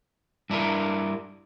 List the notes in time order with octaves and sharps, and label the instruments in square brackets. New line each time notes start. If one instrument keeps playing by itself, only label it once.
[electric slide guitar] G2 D4 E4 A#4